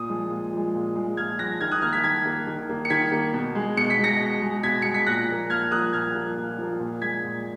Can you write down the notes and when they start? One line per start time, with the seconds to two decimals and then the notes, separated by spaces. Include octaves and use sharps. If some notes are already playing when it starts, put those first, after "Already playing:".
Already playing: A#2 D#6
0.09 F3 G#3
0.31 A#2
0.53 F3 G#3
0.74 A#2
0.96 F3 G#3
1.17 A#2 F6 G#6
1.39 F3 G#3 F#6 A#6
1.61 D#3 F6 G#6
1.71 D#6 F#6
1.82 A#3 F6 G#6
1.93 G#6 B6
2.04 D#3 G#6 B6
2.26 A#3
2.47 D#3
2.69 A#3
2.85 C#7
2.90 D#3 G#6 B6
3.12 A#3
3.34 B2
3.55 G#3
3.77 B2 C#7
3.90 B6
3.98 G#3
4.04 A#6 C#7
4.20 B2
4.42 G#3
4.63 B2 G#6 B6
4.82 G#3 C#7
4.94 B6
5.06 A#2 F#6 A#6
5.28 F3 A#3
5.50 A#2 F6 G#6
5.71 F3 A#3 D#6 F#6
5.93 A#2 F6 G#6
6.15 F3 A#3
6.37 A#2
6.58 F3 A#3
6.80 A#2
7.01 G#3 G#6 B6
7.23 A#2